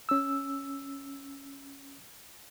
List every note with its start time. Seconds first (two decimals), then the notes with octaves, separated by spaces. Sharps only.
0.09 C#4 E6